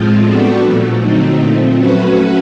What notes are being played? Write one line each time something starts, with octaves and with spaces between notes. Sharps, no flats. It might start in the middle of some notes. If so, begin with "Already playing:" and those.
Already playing: A2 F3 G#3 C4 F4
G3 B3 D4 F#4 A4
A#2 F3 A3
D3 F#3 A3 C4 D#4
A#2 F3 A3 C4
F#3 A3 C#4 F#4 B4